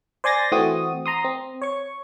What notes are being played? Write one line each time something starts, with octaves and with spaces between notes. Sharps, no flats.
C5 D5 G#5 C6 A6 A#6
E3 A3 C4 F#4 D#6
A#5 C6 D#6
C4
C#5 C#6